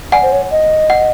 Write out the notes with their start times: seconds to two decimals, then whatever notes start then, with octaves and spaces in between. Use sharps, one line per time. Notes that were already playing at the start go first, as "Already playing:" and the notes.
0.12 D5 F#5 G#5
0.23 C5
0.32 C#5
0.51 D#5
0.90 F#5